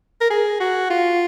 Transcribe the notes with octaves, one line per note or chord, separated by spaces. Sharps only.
A#4
G#4
F#4
F4